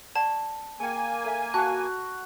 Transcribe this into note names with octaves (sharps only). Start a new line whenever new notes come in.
D5 F#5 A5 C#6
A#3 G#4 G5 G#5
A4 E5 F5
F#4 F#5 A5 F#6